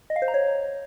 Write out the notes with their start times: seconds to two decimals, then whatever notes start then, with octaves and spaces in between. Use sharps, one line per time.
0.10 D#5
0.16 F5
0.22 C5
0.28 A#5
0.34 C#5